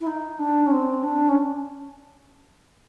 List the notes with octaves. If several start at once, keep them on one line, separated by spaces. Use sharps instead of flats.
E4
D#4
D4
C#4
C4
D4
C#4